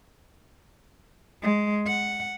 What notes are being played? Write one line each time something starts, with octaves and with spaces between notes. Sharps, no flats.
G#3
F#5